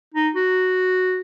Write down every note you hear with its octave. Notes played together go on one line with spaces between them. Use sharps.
D#4
F#4